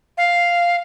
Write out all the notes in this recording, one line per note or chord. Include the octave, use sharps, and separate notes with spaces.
F5